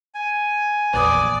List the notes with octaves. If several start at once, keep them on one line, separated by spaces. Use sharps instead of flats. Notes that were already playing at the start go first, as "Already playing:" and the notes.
G#5
A#1 E2 B4 D5 D#6